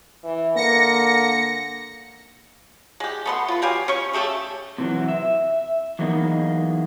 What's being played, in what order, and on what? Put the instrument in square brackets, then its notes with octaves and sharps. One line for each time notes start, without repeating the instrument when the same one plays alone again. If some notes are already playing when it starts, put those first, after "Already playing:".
[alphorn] E3
[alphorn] D3 [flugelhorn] A#3 [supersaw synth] A#6 C#7
[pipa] G#3 G4
A3 B3 C6
F4 B4
F#3 G4 F5 G#5
C#4 C#6
C#3 A3 G4 A4
[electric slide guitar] C3 E3 F#3
E5
E3 F#3 G#3 A#3 B3 D#4